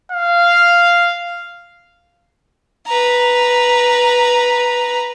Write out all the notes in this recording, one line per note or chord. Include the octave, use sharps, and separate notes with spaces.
F5
B4 A#5